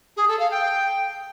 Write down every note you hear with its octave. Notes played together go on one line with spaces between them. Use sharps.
G#4
A4
F5
G5